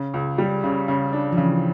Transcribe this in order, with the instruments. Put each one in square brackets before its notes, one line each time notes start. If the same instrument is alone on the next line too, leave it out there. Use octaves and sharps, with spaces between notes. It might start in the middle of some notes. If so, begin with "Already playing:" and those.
Already playing: [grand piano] C#3
C#2
G3
C#3
C#3
D4
[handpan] F3
[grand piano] C#3 [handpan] E3